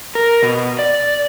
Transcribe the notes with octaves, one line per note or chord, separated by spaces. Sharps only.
A#4
B2
D5